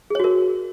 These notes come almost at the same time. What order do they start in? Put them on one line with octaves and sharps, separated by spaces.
G#4 C#5 F#4 A#4